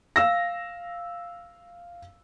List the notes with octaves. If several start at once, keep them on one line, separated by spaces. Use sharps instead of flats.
F5 E6 A#6